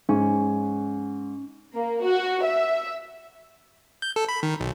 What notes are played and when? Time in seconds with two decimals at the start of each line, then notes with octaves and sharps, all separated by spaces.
0.09 G#2 C#4
1.76 A#3
2.04 F#4
2.44 E5
4.02 G6
4.16 A4
4.29 B5
4.43 D#3
4.60 B1